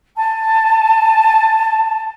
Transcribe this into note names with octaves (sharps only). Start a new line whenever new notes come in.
G#5 A5